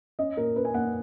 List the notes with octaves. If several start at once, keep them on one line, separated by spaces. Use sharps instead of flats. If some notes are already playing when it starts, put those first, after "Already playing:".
C#4 D#5
A#2 A#4
C#4 B4
G#5
A#3 F#5